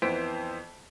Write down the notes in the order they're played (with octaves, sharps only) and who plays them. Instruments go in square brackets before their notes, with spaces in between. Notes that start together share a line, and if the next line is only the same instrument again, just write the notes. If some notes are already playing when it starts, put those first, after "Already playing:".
[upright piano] F2 E3 B3 C5 B6 D7